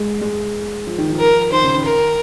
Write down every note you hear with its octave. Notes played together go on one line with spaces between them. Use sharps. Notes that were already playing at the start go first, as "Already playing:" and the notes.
Already playing: G#3
G#3
F3
D#3
F3
A#4
D#3 C5
C#3
D#3
A#4